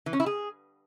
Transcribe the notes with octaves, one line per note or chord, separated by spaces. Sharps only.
E3
C#4
E4
G#4